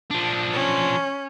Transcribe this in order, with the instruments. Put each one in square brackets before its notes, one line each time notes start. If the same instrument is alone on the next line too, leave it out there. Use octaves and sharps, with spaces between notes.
[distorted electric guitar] F3 D4
[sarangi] C#4